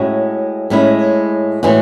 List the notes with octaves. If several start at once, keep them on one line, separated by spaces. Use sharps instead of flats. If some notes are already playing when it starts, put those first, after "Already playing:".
Already playing: A2 G#3 C#4 E4 F#4
A2 G#3 C#4 E4
A2 E3 G#3 F#4